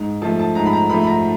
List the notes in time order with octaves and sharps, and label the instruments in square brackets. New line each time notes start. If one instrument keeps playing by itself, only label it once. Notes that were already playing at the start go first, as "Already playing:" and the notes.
Already playing: [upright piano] G#2
F3 A3 A5
A5
G#2 A#5
B5
A#5
F3 A3 B5
B5
A#5